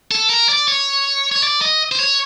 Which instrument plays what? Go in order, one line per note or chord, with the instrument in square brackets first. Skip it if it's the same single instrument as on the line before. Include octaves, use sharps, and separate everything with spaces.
[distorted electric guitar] A4
A#4
D5
C#5
C#5
D5
D#5
C5
C#5